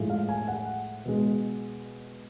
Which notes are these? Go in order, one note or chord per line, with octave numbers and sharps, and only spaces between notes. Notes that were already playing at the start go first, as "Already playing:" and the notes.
Already playing: A2 F3 G#3
F5
G#5
F#5
B2 G#3